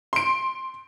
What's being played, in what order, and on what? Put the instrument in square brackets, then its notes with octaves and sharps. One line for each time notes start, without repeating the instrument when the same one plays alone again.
[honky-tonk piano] C6 D7